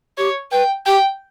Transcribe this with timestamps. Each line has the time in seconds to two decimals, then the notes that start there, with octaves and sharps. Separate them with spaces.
0.18 G4 C#5
0.52 B4 G5
0.86 G4 G5